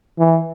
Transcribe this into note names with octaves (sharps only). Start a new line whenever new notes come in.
E3